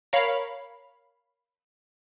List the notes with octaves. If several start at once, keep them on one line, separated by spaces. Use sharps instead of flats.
A#4 C#5 F5 B5